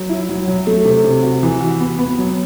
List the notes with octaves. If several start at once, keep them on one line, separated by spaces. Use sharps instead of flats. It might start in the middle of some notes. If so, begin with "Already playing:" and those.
Already playing: F#3
E4
F#3
F#3
A3
C3
C3
F#4
E3
F#4
B3
B3
F#3